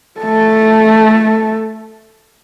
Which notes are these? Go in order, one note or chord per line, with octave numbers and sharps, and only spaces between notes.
A3 A4